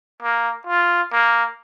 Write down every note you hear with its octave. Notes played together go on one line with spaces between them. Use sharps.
A#3
F4
A#3